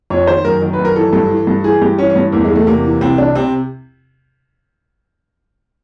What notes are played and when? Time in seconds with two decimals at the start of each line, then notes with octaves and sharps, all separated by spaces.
0.10 F2 C#5
0.27 D#3 C5
0.45 F#2 A#4
0.62 D#3
0.73 B4
0.79 F#2
0.85 A#4
0.96 E3 A4
1.13 G2 A4
1.30 E3
1.47 G2
1.64 E3 G#4
1.82 G2 G4
1.98 E3 C#4
2.10 C#4
2.16 G2
2.32 E2 A#3
2.45 G#3
2.50 E2
2.56 A3
2.66 C3 A#3
2.84 E3
3.01 C2 C4
3.18 C2 D4
3.36 C3 C4